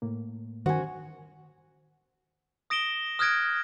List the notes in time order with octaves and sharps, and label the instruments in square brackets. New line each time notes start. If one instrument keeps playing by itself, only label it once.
[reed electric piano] A2 A#3
[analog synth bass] D#3 [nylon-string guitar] C#4 F#4 [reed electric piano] C5 G#5
[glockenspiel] D#6 A#6 D7 E7 G7
D#6 F6 F#6 G#6 A#6 D7